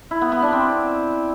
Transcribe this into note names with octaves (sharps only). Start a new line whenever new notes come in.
E4
B3
B3
D4
C4